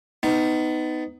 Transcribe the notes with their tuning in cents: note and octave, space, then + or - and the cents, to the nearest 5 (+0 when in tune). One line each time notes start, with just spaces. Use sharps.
B3 +30 D#4 +0